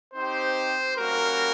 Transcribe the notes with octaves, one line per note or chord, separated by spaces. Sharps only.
C4 D#4 G4 C5
G3 A#3 C#4 F#4 A#4